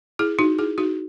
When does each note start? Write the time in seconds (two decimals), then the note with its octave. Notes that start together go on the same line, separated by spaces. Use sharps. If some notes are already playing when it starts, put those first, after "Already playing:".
0.19 E4 G#4
0.39 D#4 F#4
0.59 E4 G#4
0.78 D#4 F#4